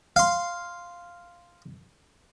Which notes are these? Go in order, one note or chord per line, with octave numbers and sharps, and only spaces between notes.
F5 C6